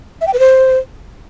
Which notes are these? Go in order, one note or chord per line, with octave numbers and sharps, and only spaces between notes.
E5
G5
B4
C5